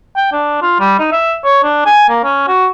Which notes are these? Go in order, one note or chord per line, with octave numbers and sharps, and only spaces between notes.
G5
D4
F4
G3
D#4
E5
C#5
D4
G#5
A#3
C#4
F#4